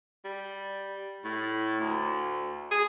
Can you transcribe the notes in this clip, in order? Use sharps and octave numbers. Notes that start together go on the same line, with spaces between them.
G3
A2
D2
G#4